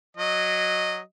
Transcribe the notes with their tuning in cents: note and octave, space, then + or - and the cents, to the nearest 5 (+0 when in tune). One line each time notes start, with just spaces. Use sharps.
F#3 -5 D#5 -10